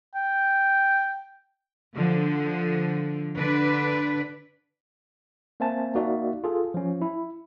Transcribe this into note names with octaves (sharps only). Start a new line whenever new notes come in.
G5
D3 F3
D3 D4 B4 D5
A#3 C4 C5 E5 G#5 A5
A#3 D#4 F#4 D5 E5
F4 G#4 A4
F3 C#4
E4